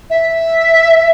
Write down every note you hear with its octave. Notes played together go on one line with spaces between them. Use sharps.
E5